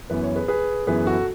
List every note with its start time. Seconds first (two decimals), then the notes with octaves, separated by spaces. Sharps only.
0.10 F#2 E3 B3 B4
0.23 C#5
0.36 G#4 B4
0.48 G#4 B4
0.87 F#2 E3 B3 G#4 B4
1.06 F#4 A4